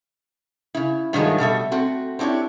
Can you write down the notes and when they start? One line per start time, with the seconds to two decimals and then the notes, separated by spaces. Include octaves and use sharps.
0.75 C#3 E4
1.13 G2 D#3 F3 F#3 G#3 A3
1.38 B2 G3 A3 E5
1.72 A3 C4 F#4
2.19 C4 D4 E4 G4 C#5